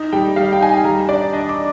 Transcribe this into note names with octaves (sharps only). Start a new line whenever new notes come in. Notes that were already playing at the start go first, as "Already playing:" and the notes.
Already playing: D#4
G3 G5
G3 F5
G5
D#4 G#5
G5
G3 A#5
D4 D5
D4 D#5
D6